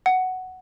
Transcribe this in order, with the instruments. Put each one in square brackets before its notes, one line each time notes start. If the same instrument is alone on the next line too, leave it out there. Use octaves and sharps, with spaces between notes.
[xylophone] F#5